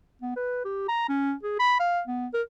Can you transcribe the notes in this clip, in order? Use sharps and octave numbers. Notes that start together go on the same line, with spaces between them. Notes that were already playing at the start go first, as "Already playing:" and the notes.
B3
B4
G4
A#5
C#4
G#4
B5
F5
B3
A#4